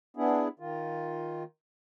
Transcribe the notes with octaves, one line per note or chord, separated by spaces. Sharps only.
B3 D4 E4 G#4
D#3 F4